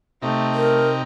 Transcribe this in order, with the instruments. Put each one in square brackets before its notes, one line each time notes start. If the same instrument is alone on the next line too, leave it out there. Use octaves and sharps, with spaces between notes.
[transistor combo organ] C3 D#4 [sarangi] A3
[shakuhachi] A#4